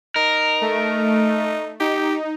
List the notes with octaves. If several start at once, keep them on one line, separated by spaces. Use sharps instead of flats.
D#4 A#4
A3
D#4 G4